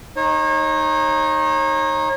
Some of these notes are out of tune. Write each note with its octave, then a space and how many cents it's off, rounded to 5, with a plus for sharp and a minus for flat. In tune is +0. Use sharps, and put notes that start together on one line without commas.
D#4 +0 C#5 -35